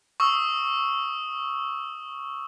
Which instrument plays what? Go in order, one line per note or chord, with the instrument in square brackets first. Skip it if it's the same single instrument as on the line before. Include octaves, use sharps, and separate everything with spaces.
[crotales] C#6 D#6 E6